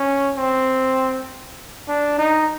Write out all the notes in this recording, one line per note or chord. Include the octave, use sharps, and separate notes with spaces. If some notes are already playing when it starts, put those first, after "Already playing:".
Already playing: C#4
C4
D4
D#4